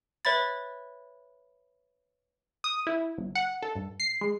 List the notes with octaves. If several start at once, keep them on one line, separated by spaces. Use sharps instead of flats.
B4 C#5 E5 B5 A6
D#6
E4
G1
F#5
A4
G2
C7
G#3